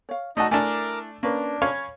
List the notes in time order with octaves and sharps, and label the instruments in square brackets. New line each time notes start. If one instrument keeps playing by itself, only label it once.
[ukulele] C#5 F5
[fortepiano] A3 F#4 [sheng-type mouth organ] D#4 D#5 [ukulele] D5 A5
[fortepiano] A3 D4 [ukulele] E4 G#5 [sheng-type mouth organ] A#4 D6
[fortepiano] A#3 [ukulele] C#4 A#4 B4 [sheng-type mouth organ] D4
[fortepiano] C#4 C#5 F5 [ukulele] B5